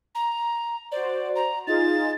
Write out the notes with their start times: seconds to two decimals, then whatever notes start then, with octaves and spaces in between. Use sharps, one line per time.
0.15 A#5
0.92 F#4 C5 D5
1.36 A#5
1.67 D#4 F4 G#4 A6